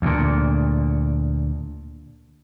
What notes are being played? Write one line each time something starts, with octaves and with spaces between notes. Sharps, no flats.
D2 A#2